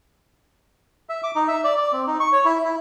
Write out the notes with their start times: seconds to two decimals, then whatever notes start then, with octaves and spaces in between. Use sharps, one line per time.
1.09 E5
1.23 D6
1.36 D#4
1.48 E5
1.64 D5
1.77 D5
1.93 C4
2.07 D#4
2.20 C#6
2.32 C#5
2.45 E4
2.65 E4